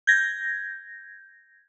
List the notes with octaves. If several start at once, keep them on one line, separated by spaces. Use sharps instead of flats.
G6 G#6 A#6